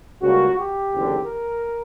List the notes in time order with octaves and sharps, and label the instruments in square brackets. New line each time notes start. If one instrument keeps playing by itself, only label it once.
[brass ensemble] C#2 C#3 G3 A#3 F#4
G4
F#1 E2 D3
A#4